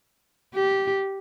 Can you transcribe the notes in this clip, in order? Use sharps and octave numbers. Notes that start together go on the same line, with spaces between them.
G4